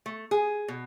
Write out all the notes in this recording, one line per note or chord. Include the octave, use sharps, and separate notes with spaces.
A3
G#4
B2